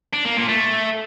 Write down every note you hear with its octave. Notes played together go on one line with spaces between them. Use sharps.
D4
A#3
A#2
A3